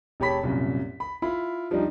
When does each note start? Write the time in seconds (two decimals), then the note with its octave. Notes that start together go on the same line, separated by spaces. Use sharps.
0.20 E1 G4 C#5 A5 B5 B6
0.44 C2 F#2 A#2
1.00 B5
1.22 E4 F4 B5
1.71 F3 G3 D4 D#4